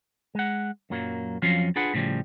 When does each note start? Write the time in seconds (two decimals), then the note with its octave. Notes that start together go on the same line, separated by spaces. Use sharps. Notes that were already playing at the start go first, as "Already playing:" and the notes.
0.35 G#3 F#5
0.90 F#2 A#2 F#3 A#3
1.42 F2 F3 F#3 C#4 F4 F5
1.76 D4 F4 G#4 B4 F#5
1.94 A2 C#3 F3 G3